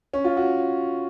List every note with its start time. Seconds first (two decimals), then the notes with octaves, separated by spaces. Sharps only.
0.13 C#4
0.24 F4
0.37 F#4